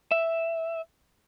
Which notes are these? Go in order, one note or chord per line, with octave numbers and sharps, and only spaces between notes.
E5